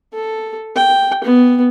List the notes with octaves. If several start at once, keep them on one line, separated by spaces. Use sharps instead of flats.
A4
G5
B3